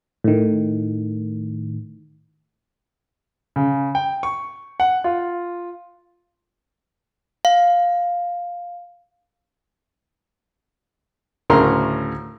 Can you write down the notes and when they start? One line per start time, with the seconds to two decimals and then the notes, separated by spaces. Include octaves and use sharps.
0.24 A2 D#3
3.56 C#3
3.95 G5
4.23 C#6
4.80 F#5
5.04 F4
7.45 F5
11.50 D2 A2 C#3 A#4 A#5 C6